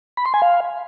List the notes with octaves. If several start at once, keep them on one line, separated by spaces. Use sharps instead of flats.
B5
C6
G#5
F5